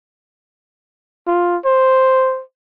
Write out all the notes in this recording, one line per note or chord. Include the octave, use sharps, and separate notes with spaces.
F4
C5